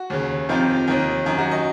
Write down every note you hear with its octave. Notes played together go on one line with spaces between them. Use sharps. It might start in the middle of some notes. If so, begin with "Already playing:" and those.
Already playing: F#4
D#2 C#3
F2 C3 D#3 F4
D#2 D#3
F#2 D#3
F#4
D#5